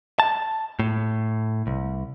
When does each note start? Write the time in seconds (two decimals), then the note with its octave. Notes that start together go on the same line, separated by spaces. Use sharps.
0.20 A5
0.79 A2
1.67 C2